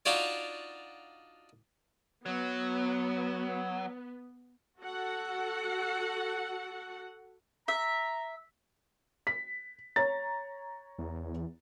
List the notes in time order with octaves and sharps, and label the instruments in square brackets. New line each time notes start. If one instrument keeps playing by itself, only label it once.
[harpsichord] D4 D#4 F4 F#4 C#5 D5
[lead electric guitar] F#3 [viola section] B3
[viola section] F#4 A4 F#5
[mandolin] E5 [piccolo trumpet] A#5
[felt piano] B6
C#5 A#5 A6
[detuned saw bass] E2